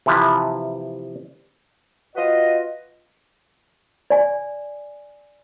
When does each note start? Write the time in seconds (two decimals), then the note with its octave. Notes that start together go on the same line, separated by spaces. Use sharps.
0.06 C3 E3 F3 B4
2.15 F4 F#4 B4 D#5
4.10 D5 G#5